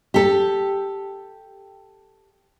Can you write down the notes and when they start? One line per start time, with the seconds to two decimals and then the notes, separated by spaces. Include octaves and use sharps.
0.14 G4 A4